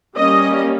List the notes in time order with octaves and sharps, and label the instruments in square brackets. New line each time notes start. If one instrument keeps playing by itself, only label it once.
[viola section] G3 A#3 C#4 D#5